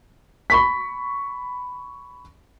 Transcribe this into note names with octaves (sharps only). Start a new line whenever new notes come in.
B5 C#6 B6